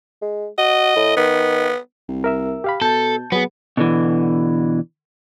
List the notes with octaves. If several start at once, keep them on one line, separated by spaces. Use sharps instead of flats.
G#3
F#4 D#5
A2
D#3 B3
C2
A#4 E5 E6
G4 F5 B5
B2 A4 A5 G6
F#3 B3 G#4
B2 D3 E3